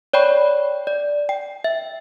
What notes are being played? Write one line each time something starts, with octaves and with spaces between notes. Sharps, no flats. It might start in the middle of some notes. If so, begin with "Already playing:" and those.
C#5 D5 G5 B5 C#6
D5
G5
E5